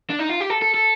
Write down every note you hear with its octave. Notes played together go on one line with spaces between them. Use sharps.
D4
D#4
F4
G4
A4
A4
A4